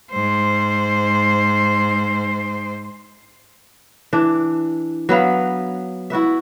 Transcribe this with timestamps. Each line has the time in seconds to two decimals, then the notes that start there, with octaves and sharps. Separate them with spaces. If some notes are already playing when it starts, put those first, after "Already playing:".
0.12 G#2 C5
4.13 E3 D4
5.09 F#3 B3 B4 F5
6.10 E4 F#4 B4 E5